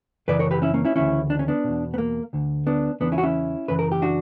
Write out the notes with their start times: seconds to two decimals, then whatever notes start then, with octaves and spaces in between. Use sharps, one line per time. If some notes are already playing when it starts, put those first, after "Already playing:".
0.28 F#2 C#3 E3 B4 D5
0.39 A#4 C#5
0.51 G4 B4
0.62 C#4 E4
0.74 A#3 C#4
0.85 C#4 E4
0.96 D2 C#3 E3 C#4 E4
1.30 D4
1.39 C#4
1.48 B3 D4
1.64 E2 B2
1.94 B3
1.98 A#3
2.33 D2 D3
2.67 B3 D4
3.00 E2 C#3 E3 B3 D4
3.12 C#4 E4
3.18 F#4
3.23 C#4 E4
3.68 F#2 C#3 E3 B4
3.79 A#4
3.92 G4
4.02 D4 F#4